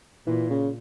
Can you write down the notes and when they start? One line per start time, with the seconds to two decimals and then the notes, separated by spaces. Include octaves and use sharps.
0.26 A#2 E3
0.50 C#3